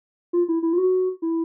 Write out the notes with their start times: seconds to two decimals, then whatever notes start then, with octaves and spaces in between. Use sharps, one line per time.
0.33 F4
0.48 E4
0.63 E4
0.73 F4
0.78 F#4
1.22 E4